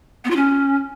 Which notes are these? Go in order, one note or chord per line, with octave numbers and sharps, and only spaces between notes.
B3
F4
C#4